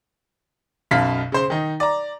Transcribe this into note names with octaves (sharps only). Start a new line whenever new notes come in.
B1 F#2 B2 F5 B6
C#3 C5 C6
D#3 D#4
D5 A#5